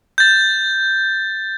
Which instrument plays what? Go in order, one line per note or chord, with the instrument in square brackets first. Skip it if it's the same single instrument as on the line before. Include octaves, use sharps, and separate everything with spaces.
[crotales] G6 A6